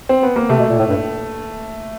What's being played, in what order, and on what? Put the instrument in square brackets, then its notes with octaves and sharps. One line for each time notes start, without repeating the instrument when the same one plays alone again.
[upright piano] C4
B3
A#3
[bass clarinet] C3 [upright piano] A3
[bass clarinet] B2
A#2
A2
G2